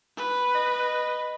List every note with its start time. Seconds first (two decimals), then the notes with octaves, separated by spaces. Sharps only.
0.17 B4
0.55 D#5